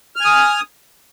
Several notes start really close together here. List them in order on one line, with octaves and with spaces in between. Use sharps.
F6 G#5 D#6